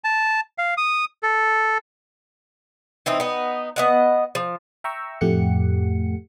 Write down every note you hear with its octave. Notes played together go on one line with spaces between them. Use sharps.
A5
F5
D#6
A4
E3 C4 D#4
B3 D#4
B3 D#5 F#5
F3
E5 G5 A#5 C#6 E6
F2 A2 A3 G4 F#5 C#7